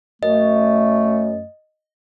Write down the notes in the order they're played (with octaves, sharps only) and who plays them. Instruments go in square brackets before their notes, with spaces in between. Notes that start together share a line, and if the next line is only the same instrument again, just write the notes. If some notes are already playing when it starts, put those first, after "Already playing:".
[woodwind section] F#2 A3 [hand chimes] D#5